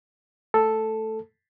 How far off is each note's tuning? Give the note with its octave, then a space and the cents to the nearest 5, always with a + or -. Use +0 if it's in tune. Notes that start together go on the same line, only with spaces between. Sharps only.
A3 +0 A4 +0